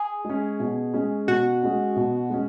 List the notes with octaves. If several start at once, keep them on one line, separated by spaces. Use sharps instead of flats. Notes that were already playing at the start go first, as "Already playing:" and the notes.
Already playing: G#4
G#3 C#4
B2
G#3 C#4
B2 F#4
G#3 C#4
B2
G#3 C#4